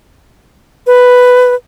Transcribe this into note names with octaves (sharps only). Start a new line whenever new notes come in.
B4